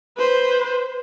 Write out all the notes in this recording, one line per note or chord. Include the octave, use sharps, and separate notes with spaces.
B4 C5